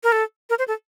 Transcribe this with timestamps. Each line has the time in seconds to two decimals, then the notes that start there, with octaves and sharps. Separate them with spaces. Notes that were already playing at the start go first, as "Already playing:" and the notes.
0.04 A#4
0.12 A4
0.50 A#4
0.59 C5
0.68 A4